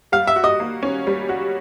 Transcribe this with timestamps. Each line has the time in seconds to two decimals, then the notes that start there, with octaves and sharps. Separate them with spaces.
0.12 G3 F5
0.27 E5
0.36 F#4
0.44 D#5
0.60 A#3
0.83 C#4
1.07 G3
1.29 F#4